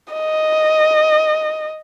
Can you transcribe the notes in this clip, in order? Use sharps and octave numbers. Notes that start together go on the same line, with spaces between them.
D#5